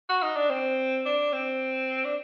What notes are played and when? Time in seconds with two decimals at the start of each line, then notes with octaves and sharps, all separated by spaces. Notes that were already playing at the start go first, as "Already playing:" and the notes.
0.09 F#4
0.23 D#4
0.36 D4
0.50 C4
1.06 D4
1.33 C4
2.05 D4